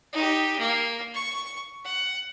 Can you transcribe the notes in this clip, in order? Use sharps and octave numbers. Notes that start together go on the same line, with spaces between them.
D#4 G4
A#3
C#6
F#5